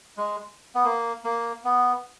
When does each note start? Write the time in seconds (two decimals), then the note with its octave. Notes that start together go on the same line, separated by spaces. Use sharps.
0.17 G#3
0.75 B3
0.84 A#3
1.24 A#3
1.64 B3